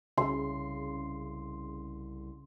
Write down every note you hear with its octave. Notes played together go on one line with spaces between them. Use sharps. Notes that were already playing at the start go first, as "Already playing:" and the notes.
C2 C#3 C6